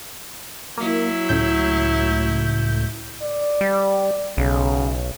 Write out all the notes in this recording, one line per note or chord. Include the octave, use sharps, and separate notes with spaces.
F#3 A#3 E4
C#2 A2 G6
D5
G3
B1 C#3